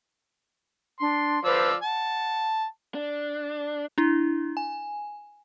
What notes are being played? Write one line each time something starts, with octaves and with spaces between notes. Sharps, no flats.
D4 C6
F3 B4 C5 D5 E6
F#5 A5
D4
D4 E4
G#5